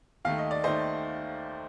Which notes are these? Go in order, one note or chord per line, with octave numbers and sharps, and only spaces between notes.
D#2 D#3 A3 F5
D#5
D5
D#2 D#3 A3 C5 D#5